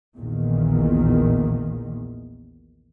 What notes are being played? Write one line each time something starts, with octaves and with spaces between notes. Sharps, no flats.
A#1 E2 A#2 D#3